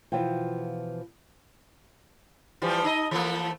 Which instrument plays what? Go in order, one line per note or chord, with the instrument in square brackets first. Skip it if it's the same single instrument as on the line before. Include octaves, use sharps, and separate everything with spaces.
[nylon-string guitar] B2 E3 F3 F4 G5
[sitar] E3 F3 G3
D#4 D#5
E3 A3 A#3